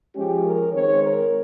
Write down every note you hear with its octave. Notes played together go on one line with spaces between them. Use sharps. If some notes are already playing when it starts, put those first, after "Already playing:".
F3 G#3 C#4 G4
A#4
D#3 G#3 C4 C#5
A#4